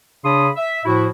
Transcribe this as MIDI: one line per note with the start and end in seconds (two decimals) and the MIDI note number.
0.24 0.49 49
0.24 0.49 62
0.24 0.49 73
0.24 0.49 83
0.24 0.49 84
0.24 0.49 87
0.56 0.80 76
0.85 1.07 45
0.85 1.07 53
0.85 1.07 64
0.85 1.07 66